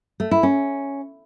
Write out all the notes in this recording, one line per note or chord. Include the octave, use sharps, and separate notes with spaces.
A3
E4
C#4